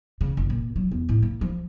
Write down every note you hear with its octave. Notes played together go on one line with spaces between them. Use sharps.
C#3
F#1
A#2
F#3
E2
A2
A#3
F3